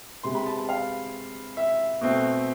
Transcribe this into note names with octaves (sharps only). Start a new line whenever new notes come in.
C3 G#3 B3 C6
B5
A5
A5
F5
E5
B2 A3 C4